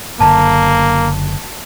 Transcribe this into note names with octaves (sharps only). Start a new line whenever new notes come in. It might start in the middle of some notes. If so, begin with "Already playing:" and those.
F#1 D3 A#3 A5